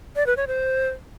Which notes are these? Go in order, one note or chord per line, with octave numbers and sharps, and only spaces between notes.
D5
B4
C#5
C5